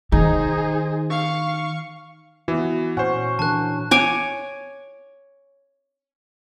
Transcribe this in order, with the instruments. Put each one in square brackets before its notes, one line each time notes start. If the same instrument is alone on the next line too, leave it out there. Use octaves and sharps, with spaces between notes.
[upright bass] D#3 [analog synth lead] D#4 [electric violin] G#4 C5
[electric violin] F5 [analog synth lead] C#6
[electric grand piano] E3 B3 [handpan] F#4
[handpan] A#2 [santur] C#4 [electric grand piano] C5 F#5
[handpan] E3 D4 A#4 [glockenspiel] A5 F#6
[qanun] C#5 G#5 D6